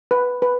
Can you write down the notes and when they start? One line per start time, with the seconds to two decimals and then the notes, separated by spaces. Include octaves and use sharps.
0.11 B4
0.42 B4